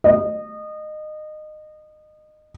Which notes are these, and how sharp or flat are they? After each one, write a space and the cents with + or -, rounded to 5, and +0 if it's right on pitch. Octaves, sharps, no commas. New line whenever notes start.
D#5 -25